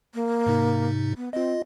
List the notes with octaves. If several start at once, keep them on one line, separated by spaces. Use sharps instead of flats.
A#3
G#2 C3 D#4
B3
C4 F4 D#5